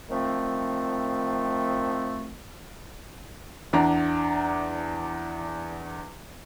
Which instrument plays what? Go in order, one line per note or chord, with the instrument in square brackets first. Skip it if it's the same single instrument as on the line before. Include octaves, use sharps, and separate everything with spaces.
[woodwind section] D#3 F3 A3 C4
[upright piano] E2 D4 A#5